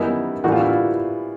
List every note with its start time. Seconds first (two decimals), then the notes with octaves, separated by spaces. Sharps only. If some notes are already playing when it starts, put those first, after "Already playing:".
Already playing: F#2 D#3 G3 B3 D#4 E4
0.44 A2 E3 G3 A#3 D4 F#4
0.52 F4
0.60 E4
0.69 F4